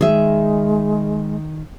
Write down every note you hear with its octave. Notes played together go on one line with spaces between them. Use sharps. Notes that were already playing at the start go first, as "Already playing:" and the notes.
D#3 G#3 G#4 E5